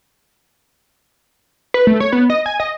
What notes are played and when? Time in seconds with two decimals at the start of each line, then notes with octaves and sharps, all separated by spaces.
1.74 B4
1.87 A3
2.00 C#5
2.13 B3
2.30 D#5
2.46 G#5
2.60 D#5